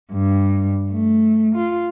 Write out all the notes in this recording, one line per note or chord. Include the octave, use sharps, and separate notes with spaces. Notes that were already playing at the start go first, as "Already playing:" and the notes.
G2
A3
F4